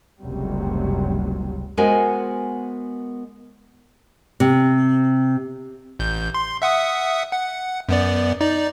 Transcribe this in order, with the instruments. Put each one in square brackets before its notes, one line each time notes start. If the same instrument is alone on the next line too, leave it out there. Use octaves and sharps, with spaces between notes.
[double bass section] F#1 C#2 C3 F#3 G3
[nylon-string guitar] G#3 B3 F#4 A#4 C5 G#5
C3
[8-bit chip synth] A1 G6
C6
E5 F#5 D#6
F#5
F#2 B3 D5
D#4 D5